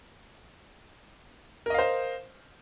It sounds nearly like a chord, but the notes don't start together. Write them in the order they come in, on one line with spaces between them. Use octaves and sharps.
A#4 D#5 F5 C5